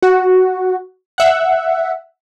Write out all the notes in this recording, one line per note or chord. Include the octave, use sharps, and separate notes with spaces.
F#4
E5 F#5